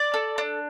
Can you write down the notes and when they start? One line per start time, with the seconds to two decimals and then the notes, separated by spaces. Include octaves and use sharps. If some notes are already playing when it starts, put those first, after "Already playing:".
Already playing: D5
0.14 A4
0.38 D4